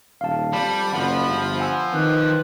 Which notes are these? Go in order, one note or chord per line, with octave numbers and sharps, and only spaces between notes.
D#1 F5 A5
F2 G3 A5 B5
F#1 F3 F#5
G1
F#5 G#5 E6
D#3 C4 B4